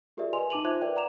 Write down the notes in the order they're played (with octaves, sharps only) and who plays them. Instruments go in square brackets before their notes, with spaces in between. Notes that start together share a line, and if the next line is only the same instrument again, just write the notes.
[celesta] F4 G4 G#4 A#4 D5 E5
B4 D#5 G#5 C6 F7
D#4 A5 D6 D#7 F7 F#7
F4 C5 E5 D6 F#6 G#6
A#4 B4 D5 E5 G5
D5 F#5 A#5 D6 E7 F7